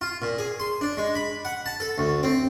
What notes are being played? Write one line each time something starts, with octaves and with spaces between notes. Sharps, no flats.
F4
A#2
G#4
C6
D4
G#3
B5
F#5
A5
A4
D2
C4